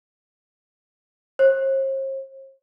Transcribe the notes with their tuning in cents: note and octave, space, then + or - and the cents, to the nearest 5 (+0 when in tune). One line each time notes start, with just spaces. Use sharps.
C5 +45